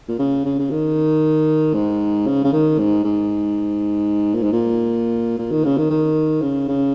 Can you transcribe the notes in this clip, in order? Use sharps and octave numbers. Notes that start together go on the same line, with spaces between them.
A#2
C#3
C#3
C#3
D#3
G#2
C#3
C#3
D#3
G#2
G#2
A#2
G#2
A#2
A#2
D#3
C#3
D#3
D#3
C#3
C#3